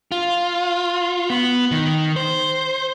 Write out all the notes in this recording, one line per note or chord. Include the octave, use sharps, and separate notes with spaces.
F4
B3
D#3
C5